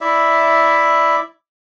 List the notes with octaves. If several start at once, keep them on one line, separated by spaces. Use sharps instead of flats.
E4 D5 E5